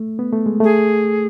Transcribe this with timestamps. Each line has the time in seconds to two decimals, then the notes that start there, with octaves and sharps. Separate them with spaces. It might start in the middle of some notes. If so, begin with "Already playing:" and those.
Already playing: A3
0.19 B3
0.32 A3
0.46 G#3
0.60 A3 G#4